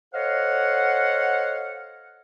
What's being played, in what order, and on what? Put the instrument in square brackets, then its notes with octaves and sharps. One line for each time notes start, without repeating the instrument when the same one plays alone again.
[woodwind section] A4 C5 C#5 D#5 F5 F#5